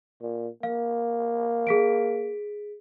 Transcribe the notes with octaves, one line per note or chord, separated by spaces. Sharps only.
A#2
A#3 F5
G#4 B6 D7